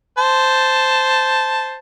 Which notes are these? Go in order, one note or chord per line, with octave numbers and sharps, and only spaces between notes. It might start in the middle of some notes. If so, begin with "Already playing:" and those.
C5 A5